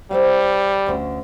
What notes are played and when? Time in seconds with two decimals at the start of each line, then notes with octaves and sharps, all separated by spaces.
0.11 G3 A4 C5 F5
0.86 D2 D3 C#4